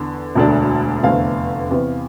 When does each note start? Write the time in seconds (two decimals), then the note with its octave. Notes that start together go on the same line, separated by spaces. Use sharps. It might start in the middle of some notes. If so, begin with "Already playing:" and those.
Already playing: E2 D3
0.35 E1 D2 D3 A3 D4
1.03 F1 E2 D3 A3 C4 F5
1.70 E2 C3 E3